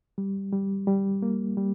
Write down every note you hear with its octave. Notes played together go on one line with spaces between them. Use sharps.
G3
G3
G3
A#3
G3